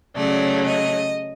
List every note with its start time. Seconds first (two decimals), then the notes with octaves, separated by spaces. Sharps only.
0.16 C#3 F#3 A3 D5
0.66 D#5